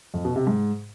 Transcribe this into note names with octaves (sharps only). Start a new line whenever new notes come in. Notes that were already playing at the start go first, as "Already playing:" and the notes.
F2
B2
C3
G#2